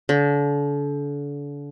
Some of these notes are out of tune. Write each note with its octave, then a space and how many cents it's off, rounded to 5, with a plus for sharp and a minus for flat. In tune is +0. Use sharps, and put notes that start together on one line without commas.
D3 -35